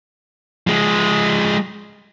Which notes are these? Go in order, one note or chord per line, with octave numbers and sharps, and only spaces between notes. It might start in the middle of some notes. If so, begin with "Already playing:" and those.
F3 G#3